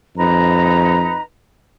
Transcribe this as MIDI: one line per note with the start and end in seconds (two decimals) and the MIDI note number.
0.17 1.16 41
0.17 1.21 63
0.17 1.21 71
0.17 1.21 82